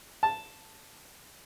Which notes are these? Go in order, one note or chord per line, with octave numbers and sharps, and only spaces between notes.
A5